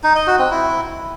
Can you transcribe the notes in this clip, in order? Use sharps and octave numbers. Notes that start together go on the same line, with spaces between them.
D#4
D#5
F#4
C4
E4